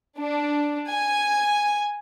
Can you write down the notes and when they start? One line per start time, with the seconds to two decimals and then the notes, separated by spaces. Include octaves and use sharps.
0.17 D4
0.89 G#5